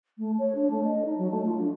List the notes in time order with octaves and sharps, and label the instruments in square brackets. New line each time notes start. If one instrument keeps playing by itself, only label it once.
[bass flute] A3
C#5
D4
A3
D#5
D#4
F#3
A3
F4
D4